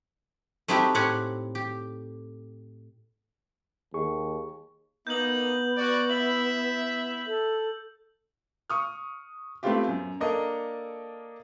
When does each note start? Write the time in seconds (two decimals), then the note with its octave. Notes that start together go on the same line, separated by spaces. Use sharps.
0.68 A3 C4 D#4 E4 F#4 G4
0.95 A2 C4 G4 F#5 G#5
1.55 G4
3.94 D#2 G#4 C#6
5.07 A#3 B3 D#4 G6 F#7
5.77 F#4 D5
6.10 E4 E5 F#7
7.27 A4
8.70 C#6 D#6 F6
9.63 A3 B3 C4 E4 F4 G4
9.87 F#2
10.20 A#3 D4 A4 A#4 D#5